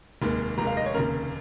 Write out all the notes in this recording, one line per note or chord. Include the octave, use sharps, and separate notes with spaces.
F1 D#2 D#3 G#3
F1 D#2 D#3 G#3 A#5
F5
D#5
C#5
F1 D#2 C#3 A#4